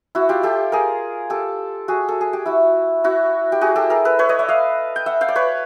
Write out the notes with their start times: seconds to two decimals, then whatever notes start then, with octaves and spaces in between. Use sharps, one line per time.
0.15 E4 F#4
0.29 F4 G4
0.43 G4 A4
0.72 G#4 A#4
1.30 G4 A4
1.88 F#4 G#4
2.08 A4
2.21 G#4
2.33 G4
2.46 E4 F#4
3.04 E4 F#4
3.52 G4
3.61 F#4 G#4
3.76 G4 A4
3.90 G#4 A#4
4.05 A4 B4
4.19 B4 C#5
4.29 C#5 D#5
4.39 D5 E5
4.48 D#5 F5
4.96 G5
5.06 E5 F#5
5.21 F5 G5
5.28 D5
5.35 B4 C#5